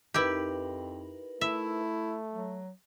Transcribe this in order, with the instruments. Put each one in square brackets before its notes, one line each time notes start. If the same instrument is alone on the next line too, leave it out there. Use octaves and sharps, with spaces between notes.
[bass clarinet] F2 [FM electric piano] D#4 A#4 B4 [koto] E4 G4
[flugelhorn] A3 [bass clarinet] E4 [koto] E5
[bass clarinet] F#3